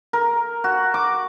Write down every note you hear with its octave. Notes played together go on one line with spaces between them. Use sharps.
A#4
F#4
D6